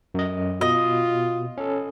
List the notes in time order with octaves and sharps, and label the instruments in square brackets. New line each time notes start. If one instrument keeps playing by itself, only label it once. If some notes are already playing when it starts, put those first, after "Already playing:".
[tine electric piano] F#2 D#5
[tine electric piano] B2 [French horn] F4 [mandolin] D#5
[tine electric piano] C#4 A4